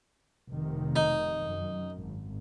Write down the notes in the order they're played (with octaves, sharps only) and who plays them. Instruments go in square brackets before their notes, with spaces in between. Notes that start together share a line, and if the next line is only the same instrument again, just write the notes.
[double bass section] F1 C3 D#3
[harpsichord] D#4
[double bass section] F#2
G#1